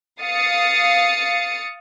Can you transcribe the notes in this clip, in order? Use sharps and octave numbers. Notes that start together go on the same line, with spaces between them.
F5 D#6 A6 C7 C#7